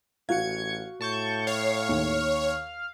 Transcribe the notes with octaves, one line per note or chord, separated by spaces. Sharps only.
A1 F#4 F5 G#6 C#7
A2 A5 C#6 G6
C#5 F5
D#2